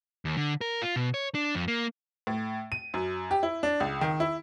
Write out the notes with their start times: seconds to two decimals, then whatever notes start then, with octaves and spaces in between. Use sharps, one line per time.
0.25 D#2
0.37 D3
0.61 A#4
0.82 F4
0.96 B2
1.14 C#5
1.35 D4
1.55 F2
1.68 A#3
2.27 A2
2.72 D#7
2.94 F#2
3.31 G4
3.43 E4
3.63 D4
3.80 C#2
4.01 D#3
4.20 E4